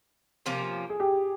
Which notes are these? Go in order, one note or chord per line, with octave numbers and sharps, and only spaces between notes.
C3 F3 A#3 C#4
G#4
G4